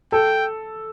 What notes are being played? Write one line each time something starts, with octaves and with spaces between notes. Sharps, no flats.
A4 G5